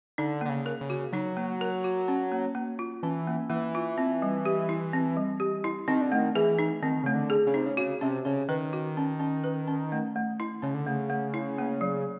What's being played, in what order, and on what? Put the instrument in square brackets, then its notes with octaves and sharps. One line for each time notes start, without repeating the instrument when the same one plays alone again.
[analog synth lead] D3 [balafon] D#4
[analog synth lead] D3 [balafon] A#3
[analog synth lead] C#3
[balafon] A#4
[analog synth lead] C#3
[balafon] F#4
[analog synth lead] F#3 [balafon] D#4
[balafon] A#3
A#4
F#4
C#4
A#3
A#3
F4
[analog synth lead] E3 [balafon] C#4
[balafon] A#3
[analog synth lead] E3 [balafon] A#3
[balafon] F4
C4
G3
G4
E4
C4
G3
G4
E4
[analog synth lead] D#3 [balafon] C4
[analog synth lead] D3
[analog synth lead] D#3 [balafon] A3
[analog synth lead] E3 [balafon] G#4
[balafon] D#4
[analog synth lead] D#3 [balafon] C4
[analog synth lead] C#3 [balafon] A3
[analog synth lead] D3
[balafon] G#4
[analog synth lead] C#3
[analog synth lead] C3 [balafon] D#4
[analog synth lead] C#3
[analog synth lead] C#3 [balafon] F#4
[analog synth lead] C3 [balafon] C#4
[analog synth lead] C#3 [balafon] C#4
[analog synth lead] D#3 [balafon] B4
[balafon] F#4
C#4
C#4
B4
C#4
A3
A3
E4
[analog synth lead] C#3 [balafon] C#4
[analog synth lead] D3
[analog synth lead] C#3 [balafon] A3
[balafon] A3
E4
A#3
F#3